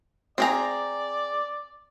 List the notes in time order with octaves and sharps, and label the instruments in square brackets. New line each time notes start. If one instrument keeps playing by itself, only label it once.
[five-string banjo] C4 G#4 A#5 [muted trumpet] D5